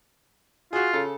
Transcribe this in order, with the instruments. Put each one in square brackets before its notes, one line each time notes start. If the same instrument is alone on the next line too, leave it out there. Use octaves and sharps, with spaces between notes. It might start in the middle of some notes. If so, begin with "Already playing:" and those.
[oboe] F4 [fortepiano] F#4 G#4
[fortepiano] C#3 A4